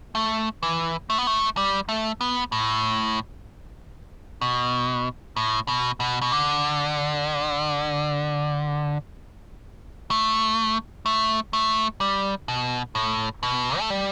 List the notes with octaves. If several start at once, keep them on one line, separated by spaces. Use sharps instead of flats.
A3
E3
A3
B3
A3
G3
A3
B3
A2
B2
A2
B2
B2
B2
D3
A3
A3
A3
G3
B2
A2
B2
A3
G3